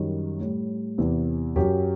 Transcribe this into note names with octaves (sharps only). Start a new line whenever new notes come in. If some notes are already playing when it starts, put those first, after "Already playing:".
Already playing: F#2 D#3 G3
A2 G3
E2 C3 E3
F#2 F#3 G4